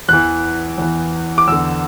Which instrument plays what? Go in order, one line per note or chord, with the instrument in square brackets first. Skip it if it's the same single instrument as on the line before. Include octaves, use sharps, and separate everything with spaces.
[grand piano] E2 E3 F#6
E2 E3
D6
E2 D3 E6